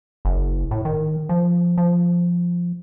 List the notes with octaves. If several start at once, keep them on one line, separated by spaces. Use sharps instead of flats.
F#1
A2
D#3
F3
F3